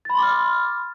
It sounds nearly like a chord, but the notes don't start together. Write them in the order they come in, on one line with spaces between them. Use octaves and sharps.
A6 B5 C6 D6 F6